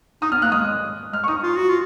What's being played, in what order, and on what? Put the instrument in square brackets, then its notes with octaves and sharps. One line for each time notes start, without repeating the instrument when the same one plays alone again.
[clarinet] D#4 [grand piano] D#6
[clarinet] B3 [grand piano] F6
[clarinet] A#3 [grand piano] F#6
[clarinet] G#3 [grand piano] D#6
[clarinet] G#3 [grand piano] F6
[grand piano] C#6
[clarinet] D#4 [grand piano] D#6
[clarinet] F4
F#4
F4